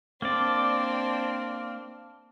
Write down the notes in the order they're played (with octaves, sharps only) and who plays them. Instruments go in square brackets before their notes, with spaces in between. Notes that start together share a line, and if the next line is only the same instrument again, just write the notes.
[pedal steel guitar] A#3 D5 [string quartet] C4 D4